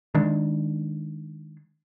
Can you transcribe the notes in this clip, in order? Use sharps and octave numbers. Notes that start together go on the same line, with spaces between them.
D#3 G#3 D4